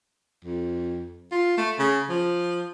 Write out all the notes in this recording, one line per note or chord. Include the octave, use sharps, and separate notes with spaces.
F2
F4
A3
C#3
F3